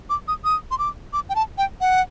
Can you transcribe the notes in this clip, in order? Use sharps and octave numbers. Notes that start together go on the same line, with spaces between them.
D6
D#6
D#6
C6
D6
D6
G5
A5
G5
F#5